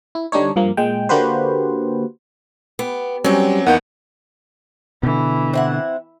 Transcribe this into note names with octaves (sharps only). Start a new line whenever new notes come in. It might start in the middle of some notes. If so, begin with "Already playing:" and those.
E4
D3 G3 D4 D#4 C#5
G2 F3 A#3
A#2 G#3 G5
D3 A#3 F#4 G4 B4 C5
B3 G4
F#3 G3 C4 C#4 G4
E2 D#3 A#3 B3 F#5 G6
B2 D3 E3
C4 E4 F#5